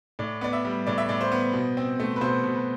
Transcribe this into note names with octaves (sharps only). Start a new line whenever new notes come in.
A2 D5
B3 D5
E5
G3
A2 D5
E5
A2 D5
C5
B3
B2
C4
A3
B4
B2 C5
B2
B4